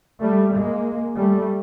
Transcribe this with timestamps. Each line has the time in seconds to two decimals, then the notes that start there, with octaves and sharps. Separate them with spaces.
0.22 G3 A3
0.54 G#3 A#3
1.18 G3 A3